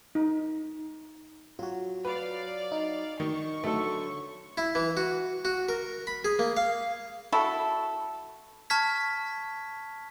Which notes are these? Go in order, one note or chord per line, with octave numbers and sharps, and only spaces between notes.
D#4
F#3 F4 F#4
B4 D5 F5
D#4
D#3 C#6
D3 F#3 A3 F#4 A4
E4
E3
F#4
F#4
A#4
B5
G#4
A#3
F5
E4 F#4 A4
A5 C#6 F6 G#6 B6